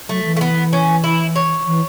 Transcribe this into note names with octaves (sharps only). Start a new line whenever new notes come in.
F#3 A3
E3
A3
B3
C#4
E4
C#5
E3